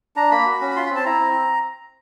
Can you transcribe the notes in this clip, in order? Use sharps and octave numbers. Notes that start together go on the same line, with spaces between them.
D4 A#5
A#3 B5
F#4
C#4
B5
F4 C6
B5
C4
A5
E4 A#5
C4